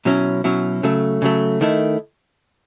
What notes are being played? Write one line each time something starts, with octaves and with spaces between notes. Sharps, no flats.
B2 F#3 C#4 E4
B2 F#3 C#4 E4
C#3 F#3 A3
C#3 F#3 A3
D#3 A3 E4